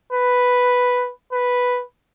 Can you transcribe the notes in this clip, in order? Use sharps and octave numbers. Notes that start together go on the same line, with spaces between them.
B4
B4